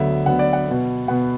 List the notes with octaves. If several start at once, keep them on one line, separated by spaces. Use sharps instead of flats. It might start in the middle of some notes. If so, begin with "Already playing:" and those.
Already playing: D2 D3 F#3 B3 E5
D2 D3 F#3 B3 F#5
D5
F#5
B2 B3
B2 B3 F#5